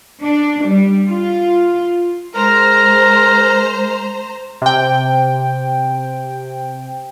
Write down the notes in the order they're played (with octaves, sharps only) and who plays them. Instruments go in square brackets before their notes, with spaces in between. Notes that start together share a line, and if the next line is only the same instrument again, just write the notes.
[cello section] D4
G3
F4
[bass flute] G#3 [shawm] A#4 [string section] C5 A#5
[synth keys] C3 G5